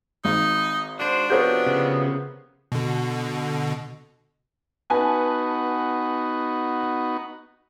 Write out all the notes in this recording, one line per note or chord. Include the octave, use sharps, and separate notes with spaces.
G#1 D#4
D4 F#4 C5
C3 F3 B3 F#4 A#4 C#5 G6
C#3
B2 D3
B3 D#4 F#4 B4 G#5 A5